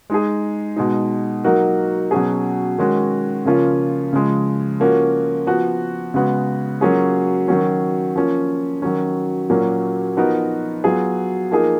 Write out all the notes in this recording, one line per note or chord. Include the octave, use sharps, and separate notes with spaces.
G#3 D#4 G#4
B2 G#3 D#4
F#3 A#3 D#4 F#4 A#4
B2 F#3 C#4 G#4
D#3 G#3 C#4 F#4
C#3 F3 A#3 C#4 F4
C#3 F3 G#3
F3 A#3 C#4 F#4
F3 B3 F#4
C#3 G#3 B3 F#4
F#3 A#3 C#4 F4 G#4
D#3 F#3 C#4
F3 A#3 C#4
D#3 F#3 C#4
A#2 F#3 A#3 C#4
F3 B3 D#4 F#4 A#4
F#3 B3 F4 G#4
F3 A#3 D#4 G#4